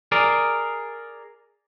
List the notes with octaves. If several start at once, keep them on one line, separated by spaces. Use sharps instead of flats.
G#4 A#4 D5